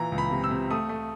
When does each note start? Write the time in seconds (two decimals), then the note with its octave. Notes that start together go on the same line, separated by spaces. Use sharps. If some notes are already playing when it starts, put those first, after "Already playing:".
Already playing: A#2 E3 A#5
0.12 C#2
0.18 B5
0.31 C3
0.44 E6
0.51 C3
0.70 A3 D#6
0.89 A3